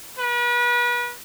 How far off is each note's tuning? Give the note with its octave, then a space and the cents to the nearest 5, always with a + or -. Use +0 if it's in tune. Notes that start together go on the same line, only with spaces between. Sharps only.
B4 -35